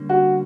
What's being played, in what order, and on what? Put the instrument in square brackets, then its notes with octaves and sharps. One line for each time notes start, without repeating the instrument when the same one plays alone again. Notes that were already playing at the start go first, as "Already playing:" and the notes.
Already playing: [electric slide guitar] D3 G3 A#3 C#4
[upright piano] F#4